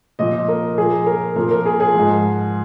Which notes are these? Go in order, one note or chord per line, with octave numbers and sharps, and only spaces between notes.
A#2 F3 D#5
A#4
A#2 F3 G#4
A#4
A#2 F3 A#4
A#4
G#4
G#4
G#2 F3